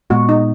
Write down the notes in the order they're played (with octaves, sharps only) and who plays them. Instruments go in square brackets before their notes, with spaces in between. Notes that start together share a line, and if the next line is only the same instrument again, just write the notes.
[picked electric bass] A#2 G#3 B3 [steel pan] F#4
[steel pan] D#4